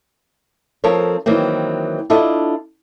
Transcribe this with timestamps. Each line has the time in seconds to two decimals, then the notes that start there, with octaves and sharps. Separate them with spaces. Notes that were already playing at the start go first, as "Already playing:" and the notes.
0.84 F3 C4 A4 A#4 C#5
1.26 D#3 E3 F#3 A#3 C4
2.10 D4 E4 F4 A4 D#5